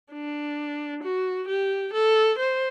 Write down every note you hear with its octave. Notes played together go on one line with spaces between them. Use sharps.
D4
F#4
G4
A4
C5